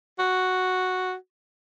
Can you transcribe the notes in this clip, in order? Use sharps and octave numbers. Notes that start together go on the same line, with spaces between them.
F#4